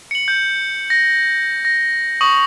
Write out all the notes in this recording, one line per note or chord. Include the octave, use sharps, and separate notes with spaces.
C#7 F#7
G6
A#6
A#6
C#6 D#6 F#7